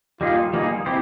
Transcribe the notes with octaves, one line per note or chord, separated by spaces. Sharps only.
G3 A#3 D#4 F4 G#4
G3 A#3 D#4 G#4
C4 E4 G4 C5